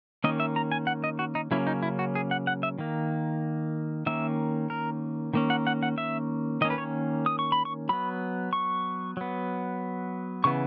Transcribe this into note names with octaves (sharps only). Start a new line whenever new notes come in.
D#3 A#3 C#4 D#5
E5
A#5
G#5
F#5
D#5
F#4
D#4
C#3 F#3 A#3 C#4 E4
D#4
E4
F#4
G#4
F#5
F#5
E5
D#3 A#3
D#3 A#3 C#4 E5
A#4
D#3 A#3 C#4
F#5
F#5
F#5
E5
D#3 A#3 C#4 D#5
B4
C#5
D#6
C#6
B5
C#6
F#3 B3 B5
C#6
F#3 B3
C#3 E3 B3 C#6